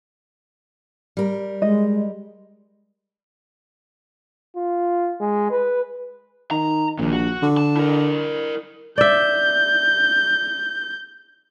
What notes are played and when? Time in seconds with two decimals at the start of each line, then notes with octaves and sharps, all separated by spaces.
1.17 G3 A#4
1.62 G#3 D#5
4.56 F4
5.20 G#3
5.51 B4
6.51 D#3 A#5
6.99 A#1 D#2 A#2
7.12 F#4
7.42 D3
7.57 A5
7.76 E4 A#4
8.98 D5 E5 G6